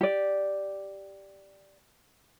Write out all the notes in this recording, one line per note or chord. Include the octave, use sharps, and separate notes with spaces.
G4 D5